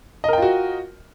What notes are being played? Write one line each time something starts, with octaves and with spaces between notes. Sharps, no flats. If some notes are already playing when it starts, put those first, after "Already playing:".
F4 F#4 A#4 D#5 G5